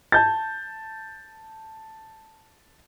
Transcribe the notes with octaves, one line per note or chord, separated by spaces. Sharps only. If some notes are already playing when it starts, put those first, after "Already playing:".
A5 G6 A6